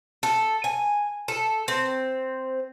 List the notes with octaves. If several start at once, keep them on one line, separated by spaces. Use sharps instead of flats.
A4
G#5
A4
C4